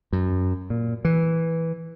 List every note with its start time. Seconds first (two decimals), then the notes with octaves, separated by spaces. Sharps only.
0.13 F#2
0.70 A#2
1.05 E3